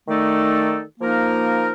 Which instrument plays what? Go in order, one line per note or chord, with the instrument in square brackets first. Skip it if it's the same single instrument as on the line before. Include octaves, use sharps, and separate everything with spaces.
[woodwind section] D#3 A3 D#4 A4 D5
F3 A#3 D#4 A#4